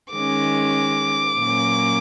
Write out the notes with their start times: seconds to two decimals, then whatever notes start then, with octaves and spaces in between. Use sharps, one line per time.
0.13 D#3 G#3 C#4 D6
1.38 A#2 F#3 A#3 C#4